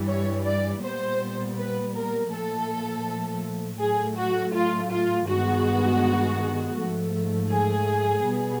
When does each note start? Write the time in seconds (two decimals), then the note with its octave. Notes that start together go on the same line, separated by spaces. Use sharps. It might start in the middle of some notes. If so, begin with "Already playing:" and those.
Already playing: G2 E3 G3
0.09 C#5
0.46 D5
0.83 A#2 G3 B3 C5
1.57 B4
1.95 A#4
2.32 A#2 F3 A3 A4
3.80 A2 F#3 A3 G#4
4.17 F#4
4.54 F4
4.91 F4
5.28 G2 D#3 G#3 B3 F#4
6.76 G#2 F3 A3
7.51 G#4
8.24 B2 G3 B3